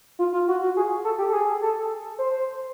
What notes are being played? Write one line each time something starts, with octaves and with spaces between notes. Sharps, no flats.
F4
F4
F#4
F#4
G#4
A4
G4
A4
G#4
A4
C5